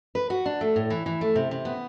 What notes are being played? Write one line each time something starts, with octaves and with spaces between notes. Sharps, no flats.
B4
F#4
D4
A3
A2
E3
E3
A3
C3
C3
B3